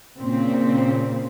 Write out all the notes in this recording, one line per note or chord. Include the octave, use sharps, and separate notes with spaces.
A#2 C#3 C4